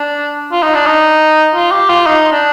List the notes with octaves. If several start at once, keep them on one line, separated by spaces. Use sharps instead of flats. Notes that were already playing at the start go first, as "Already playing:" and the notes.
Already playing: D4
F4
D#4
D4
D#4
F4
G4
F4
D#4
D4